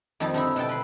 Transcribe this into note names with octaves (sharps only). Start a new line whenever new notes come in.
F2 D#3 G3 D#4 A5
D3 D#4 E4
B2 A4 G5 A5
B4 C6